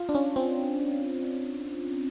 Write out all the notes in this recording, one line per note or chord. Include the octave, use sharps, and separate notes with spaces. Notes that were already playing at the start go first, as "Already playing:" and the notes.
Already playing: F4
D4
C#4
C4